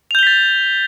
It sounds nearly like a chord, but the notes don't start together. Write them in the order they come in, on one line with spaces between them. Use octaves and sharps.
F7 G6 G7 B6 A6